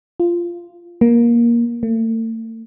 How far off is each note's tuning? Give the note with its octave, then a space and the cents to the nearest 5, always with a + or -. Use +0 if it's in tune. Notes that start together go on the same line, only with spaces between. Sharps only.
F4 -10
A#3 +15
A3 +40